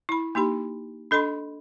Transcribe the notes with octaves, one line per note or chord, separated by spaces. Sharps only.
E4 B5
A#3 D#4 G4 B5
D4 A4 D#5 B5 C6